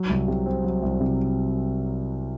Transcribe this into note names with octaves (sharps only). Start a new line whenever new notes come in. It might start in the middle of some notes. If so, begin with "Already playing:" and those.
Already playing: F#3
C2
C3
C4
F#3
C2
C3